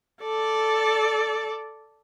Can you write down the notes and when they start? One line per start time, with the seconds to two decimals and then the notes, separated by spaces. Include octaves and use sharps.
0.23 A4 D5